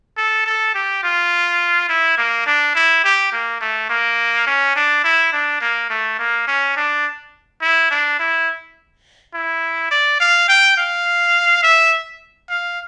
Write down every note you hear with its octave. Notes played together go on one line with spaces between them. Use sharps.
A4
A4
G4
F4
E4
A#3
D4
E4
G4
A#3
A3
A#3
C#4
D4
E4
D4
A#3
A3
A#3
C#4
D4
E4
D4
E4
E4
D5
F5
G5
F5
E5
F5